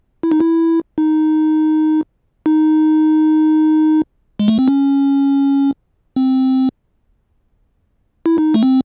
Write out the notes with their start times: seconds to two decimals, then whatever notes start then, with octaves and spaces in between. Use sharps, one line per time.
0.23 E4
0.32 D#4
0.40 E4
0.98 D#4
2.46 D#4
4.39 G#3
4.48 A3
4.59 C4
4.68 C#4
6.16 C4
8.26 E4
8.38 D#4
8.54 A3
8.63 C4